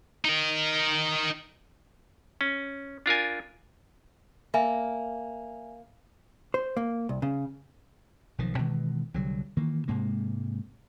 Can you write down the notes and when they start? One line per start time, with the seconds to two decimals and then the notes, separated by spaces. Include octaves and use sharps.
0.25 D#4 A#4
2.41 C#4
3.06 D4 F4 A#4 G#5
4.54 A#3 E5 G#5
6.54 C5
6.77 A#3
7.09 C2
7.22 C#3
8.38 B1 D#3 F3
8.58 B2 D#3 E3 G#3
9.14 C2 D3 F#3 G3
9.57 D#3 E3 A#3
9.88 G#2 C3 G#3 A#3